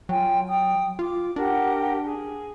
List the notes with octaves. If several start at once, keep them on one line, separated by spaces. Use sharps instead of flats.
F#3 F4 G5 G#5
G5 D#6
F4 D6
D4 G4 A#4 F#5
G#4